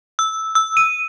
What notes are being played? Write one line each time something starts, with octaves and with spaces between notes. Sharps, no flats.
E6
E6
D#7